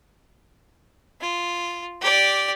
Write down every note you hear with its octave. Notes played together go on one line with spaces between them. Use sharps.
F4
G4 D5